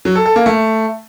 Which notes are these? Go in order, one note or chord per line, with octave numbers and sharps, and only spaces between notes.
F#3
A4
A4
A#3
A3